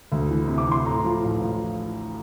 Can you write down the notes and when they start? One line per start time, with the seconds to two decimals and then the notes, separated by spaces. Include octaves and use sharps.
0.12 D2
0.29 E3
0.48 C3
0.58 D6
0.66 E3
0.72 C6
0.85 A2 A#5
1.04 F3
1.23 A1
1.41 F3